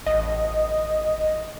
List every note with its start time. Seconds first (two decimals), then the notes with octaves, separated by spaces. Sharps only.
0.06 A1 D#5